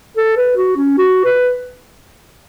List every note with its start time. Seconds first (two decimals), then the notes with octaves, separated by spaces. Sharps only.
0.17 A4
0.37 B4
0.57 F#4
0.77 C#4
0.98 F#4
1.24 B4